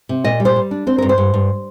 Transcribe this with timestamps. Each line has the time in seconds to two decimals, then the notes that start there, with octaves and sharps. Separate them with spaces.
0.09 C3
0.24 A#2 D#5
0.40 G3
0.45 C5
0.56 G3
0.71 D4
0.87 C4 C5
0.98 G2 A#4
1.09 C5
1.18 G2
1.34 G2